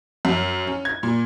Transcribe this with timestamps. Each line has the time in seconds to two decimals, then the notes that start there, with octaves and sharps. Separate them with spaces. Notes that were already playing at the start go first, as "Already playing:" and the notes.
0.25 F#2
0.67 C#4
0.85 G#6
1.03 A#2